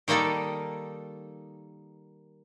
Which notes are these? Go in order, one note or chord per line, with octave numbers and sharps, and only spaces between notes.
D#3 G3 A#3 D#4 A4